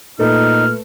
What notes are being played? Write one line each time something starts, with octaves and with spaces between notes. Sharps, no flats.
A#2 A3 D#4 A4 B4 F6